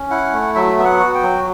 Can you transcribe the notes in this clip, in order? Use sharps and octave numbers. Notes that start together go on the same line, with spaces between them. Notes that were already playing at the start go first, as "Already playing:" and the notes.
Already playing: C#4
E4 F#5
A3
F#3 E5
B3 E5
F#5
F#4
G5
F#3